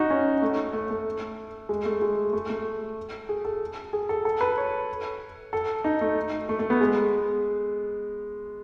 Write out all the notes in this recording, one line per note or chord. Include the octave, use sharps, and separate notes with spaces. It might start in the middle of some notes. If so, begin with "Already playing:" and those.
Already playing: D#4 F#4
C#4
A3
A3
A3
G#3
A3
G#3
A3
A3
G#4
A4
G#4
A4
A4
B4
C#5
A4
D#4
A3
A3
A3
B3
G#3